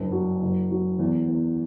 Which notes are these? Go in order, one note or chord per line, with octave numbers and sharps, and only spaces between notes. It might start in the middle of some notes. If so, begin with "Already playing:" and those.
Already playing: F#1 G2
F#3
F#1
F#3
E2
E2